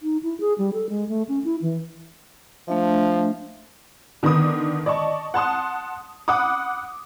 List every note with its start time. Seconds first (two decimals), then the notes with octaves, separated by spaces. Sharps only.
0.02 D#4
0.23 E4
0.40 G#4
0.58 G3
0.73 A4
0.89 G#3
1.09 A3
1.29 C#4
1.44 E4
1.62 E3
2.68 F3 A3 D4 E5
4.23 D3 D#3 B3 D6 D#6
4.86 D5 D#5 A5 C#6
5.34 F#5 A5 C6 D#6
6.28 F#5 B5 D6 D#6